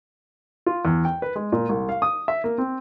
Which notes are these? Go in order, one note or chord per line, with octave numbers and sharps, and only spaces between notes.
F4
E2
G5
B4
G#3
A#2
C2
F5
D#6
E5
A#3
C4